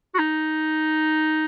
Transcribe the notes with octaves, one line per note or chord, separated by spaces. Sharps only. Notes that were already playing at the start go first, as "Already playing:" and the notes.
F#4
D#4